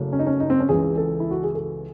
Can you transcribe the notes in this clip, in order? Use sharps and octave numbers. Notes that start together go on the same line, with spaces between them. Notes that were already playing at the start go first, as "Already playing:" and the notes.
Already playing: F#1 C#3 F#3 A3
C#4
D#4
C#4
D#4
C4
C#4
C#2 C#3 E3 G#4
A4
E4
F#4
G#4
A4